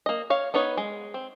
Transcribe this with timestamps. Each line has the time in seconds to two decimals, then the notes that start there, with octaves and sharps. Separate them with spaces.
0.06 A#3 D#5
0.30 C#5 F5
0.54 B3 D#4 B4 C#5
0.77 G#3
1.14 C4